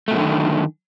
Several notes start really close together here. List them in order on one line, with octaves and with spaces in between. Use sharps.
A3 B2 F#2 D3 D#3